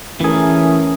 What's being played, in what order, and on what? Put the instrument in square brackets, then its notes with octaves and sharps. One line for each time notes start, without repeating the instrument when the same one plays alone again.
[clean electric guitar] E3 G#4 [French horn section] A3 A#4 [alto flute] C#4